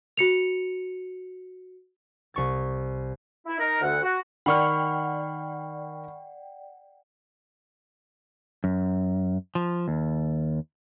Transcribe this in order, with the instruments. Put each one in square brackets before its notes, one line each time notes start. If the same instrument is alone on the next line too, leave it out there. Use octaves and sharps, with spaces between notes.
[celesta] F#4 C#7 F7
[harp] C2 C#6 A6
[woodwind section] E4
D#4 A#4
D2 D3 F#5
F#4
[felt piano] D#3 A#4 [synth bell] D5 F#5 G5 [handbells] B5 C#6 F6
[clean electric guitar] F#2
F3
D#2